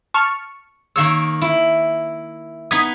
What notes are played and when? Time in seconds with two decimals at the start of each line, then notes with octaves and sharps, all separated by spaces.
0.14 A5 C#6 F6
0.96 D#3 A#3 C#5 E6
1.41 E4
2.71 B3 D#4 D#6 G#6 B6